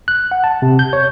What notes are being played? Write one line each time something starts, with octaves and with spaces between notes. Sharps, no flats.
F#6
F#5
A5
C3
G6
C#5